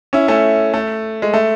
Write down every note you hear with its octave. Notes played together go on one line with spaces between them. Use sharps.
C#4 E4
A3 C#4
A3
G#3
A3